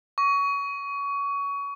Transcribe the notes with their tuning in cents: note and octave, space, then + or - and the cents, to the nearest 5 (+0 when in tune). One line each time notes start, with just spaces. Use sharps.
C#6 +25